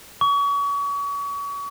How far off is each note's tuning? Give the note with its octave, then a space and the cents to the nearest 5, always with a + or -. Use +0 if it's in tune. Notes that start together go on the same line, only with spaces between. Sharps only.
C#6 +35